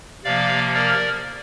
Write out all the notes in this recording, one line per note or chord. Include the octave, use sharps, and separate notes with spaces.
C3 F3 A#3 D5 F5
A#4 D5